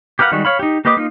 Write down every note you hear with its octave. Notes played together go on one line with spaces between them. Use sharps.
G4 A#4 B4 F5 F#5
D#3 G3 G#3 F#4
C#5 F5 B5
D#4 G4
A#3 G4 B4 D#5 D6
A#3 D#4 F4